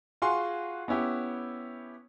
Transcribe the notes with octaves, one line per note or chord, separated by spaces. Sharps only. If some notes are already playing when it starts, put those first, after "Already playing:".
F4 F#4 G#4 G#5 C6 C#6
B3 C#4 E4 G4